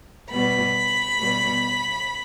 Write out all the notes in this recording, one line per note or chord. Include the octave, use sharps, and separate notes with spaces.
B2 G3 B3 B5
B2 G3 B3